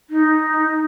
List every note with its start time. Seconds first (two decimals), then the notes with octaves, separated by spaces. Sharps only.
0.10 D#4